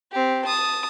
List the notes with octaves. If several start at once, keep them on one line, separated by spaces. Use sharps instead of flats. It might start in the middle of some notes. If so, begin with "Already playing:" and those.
C4 G4
A5 D#6